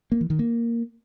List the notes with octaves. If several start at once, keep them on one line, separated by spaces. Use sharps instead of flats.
A#3
E3
D#3
A#3